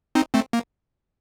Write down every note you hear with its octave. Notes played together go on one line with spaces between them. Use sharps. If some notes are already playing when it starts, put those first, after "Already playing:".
C4 D#4
A3 C4
A#3